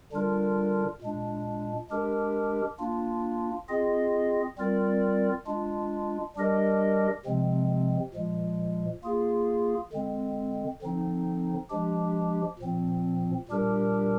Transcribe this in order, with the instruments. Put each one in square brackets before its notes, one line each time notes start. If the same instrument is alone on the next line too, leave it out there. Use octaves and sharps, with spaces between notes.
[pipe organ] D3 G3 D4 F4 A#4
A#2 G#3 D4
G#3 D4 G4 A#4
A#3 D4 F4
C4 F4 G#4 D#5
G3 C4 F4 A#4 D5
G#3 D4 F4
G3 D4 G4 A#4 D#5
C3 F3 G#3 C4
A#2 F3 G#3
A#3 F4 G#4
D3 G#3 C4
D3 F3 C4 D#4
F3 G#3 D4 G4
A#2 F3 C4
A#2 G3 D4 G4 A#4